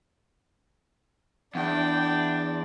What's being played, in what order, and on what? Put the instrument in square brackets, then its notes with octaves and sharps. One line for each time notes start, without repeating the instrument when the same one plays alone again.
[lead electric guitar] E2 [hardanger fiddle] D4 [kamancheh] G5